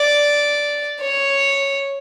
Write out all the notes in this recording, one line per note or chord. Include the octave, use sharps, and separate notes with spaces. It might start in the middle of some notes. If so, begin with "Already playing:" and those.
Already playing: D5
C#5